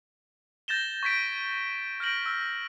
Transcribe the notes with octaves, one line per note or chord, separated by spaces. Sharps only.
G6 A6 A#6 E7 G7
C#6 G#6 B6 D7
F6 G6 A#6 D7 F#7 G7
E6 F6